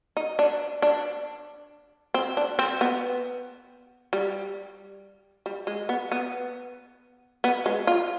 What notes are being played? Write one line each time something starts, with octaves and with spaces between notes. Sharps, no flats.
D#4
D4
D4
C4
D4
C4
B3
G3
G3
G#3
B3
B3
B3
G#3
F4